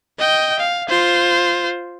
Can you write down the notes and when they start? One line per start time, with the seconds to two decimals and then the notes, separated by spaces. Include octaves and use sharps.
0.19 D#5 G5
0.60 F5
0.89 F4 C5